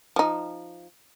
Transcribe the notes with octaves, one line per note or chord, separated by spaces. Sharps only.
F3 D#4